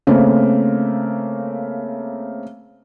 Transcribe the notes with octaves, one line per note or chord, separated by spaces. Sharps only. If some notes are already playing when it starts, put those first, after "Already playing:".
C#3 A3 A#3 C4